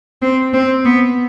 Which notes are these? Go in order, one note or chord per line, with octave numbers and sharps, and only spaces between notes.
C4
C4
B3